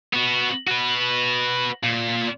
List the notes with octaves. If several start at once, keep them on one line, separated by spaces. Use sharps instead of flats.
B3 F#4
F#4 B4
A#2